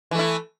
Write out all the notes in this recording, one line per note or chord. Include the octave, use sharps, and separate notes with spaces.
E3 A3 E4